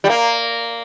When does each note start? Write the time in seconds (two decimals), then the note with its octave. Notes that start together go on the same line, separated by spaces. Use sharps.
0.04 G3
0.09 A#3